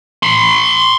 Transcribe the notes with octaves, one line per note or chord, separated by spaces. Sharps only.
B5 C6